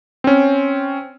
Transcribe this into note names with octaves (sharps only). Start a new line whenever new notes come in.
C4 C#4